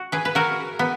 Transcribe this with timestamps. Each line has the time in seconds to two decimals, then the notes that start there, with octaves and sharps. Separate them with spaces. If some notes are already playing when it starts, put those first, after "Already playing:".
Already playing: F#4
0.12 G#4 B4
0.25 B4
0.35 F#4 A#4
0.79 B3